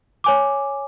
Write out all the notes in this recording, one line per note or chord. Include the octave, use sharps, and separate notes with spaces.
C#5 G#5 D6